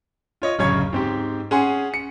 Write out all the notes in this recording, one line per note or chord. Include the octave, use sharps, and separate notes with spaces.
F4 C#5 D#5
D1 F#2 C#3 C#5 C#6 G#6
G#2 C4 G4
C#4 G#4 F#5 G#5 C6
C#7